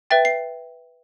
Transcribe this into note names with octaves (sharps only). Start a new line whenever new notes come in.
B4 E5 G5 A6
C7